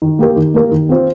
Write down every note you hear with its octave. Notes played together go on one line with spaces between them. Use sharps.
D#3
A#3 G4 A#4
D#3
A#3 G4 A#4
D#3
C4 F4 C5